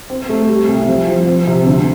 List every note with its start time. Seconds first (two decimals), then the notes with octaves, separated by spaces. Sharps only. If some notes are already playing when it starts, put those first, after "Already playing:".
0.10 C4
0.29 A3
0.48 G3
0.68 C2
0.88 F3
1.08 F3
1.27 C4
1.47 C3
1.67 D2